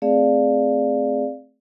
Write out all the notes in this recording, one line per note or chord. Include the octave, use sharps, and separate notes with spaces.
A3 C4 G#4 D5 F5